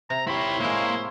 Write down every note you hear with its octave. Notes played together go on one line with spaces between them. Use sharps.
C3 A#5
E4 G4 C5 C#5 B5 C6
A2 G#3 A#3 E4